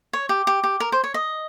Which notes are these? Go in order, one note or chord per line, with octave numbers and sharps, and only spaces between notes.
C#5
G4
G4
G4
A#4
C5
C#5
D#5